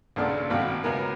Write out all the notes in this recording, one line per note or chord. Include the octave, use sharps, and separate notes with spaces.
B1 A#2 C#3 D4 A4 F6
G#1 B2 F5 G5
C#2 B2 B3 A#4 G#5